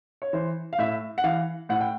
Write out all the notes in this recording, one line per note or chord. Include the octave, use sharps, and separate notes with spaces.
C#5
E3 C5
F5
A2 E5
F#5
E3 F5
A2 F#5
G5